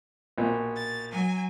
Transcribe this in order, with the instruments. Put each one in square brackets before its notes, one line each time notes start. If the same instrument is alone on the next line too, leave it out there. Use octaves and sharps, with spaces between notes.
[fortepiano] A#1 B2
[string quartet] A6
F#3 G#5